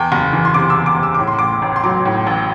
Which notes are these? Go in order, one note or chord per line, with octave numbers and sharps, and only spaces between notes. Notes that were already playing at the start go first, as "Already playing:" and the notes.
Already playing: E2 G5
F#1
E3
C6
C3 D6
E6
E2
D6
F#1
E6
A2 D6
C6
A1 D6
A1
C6
F#3 D6
A2
A1